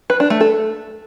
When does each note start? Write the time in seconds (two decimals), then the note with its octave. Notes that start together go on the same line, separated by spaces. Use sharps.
0.10 B4
0.20 D4
0.30 A3
0.41 A4